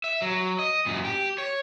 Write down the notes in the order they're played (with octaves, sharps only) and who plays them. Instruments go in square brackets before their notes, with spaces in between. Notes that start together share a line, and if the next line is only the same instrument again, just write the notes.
[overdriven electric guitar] E5
F#3
D#5
F#2 A#2
G4
C#5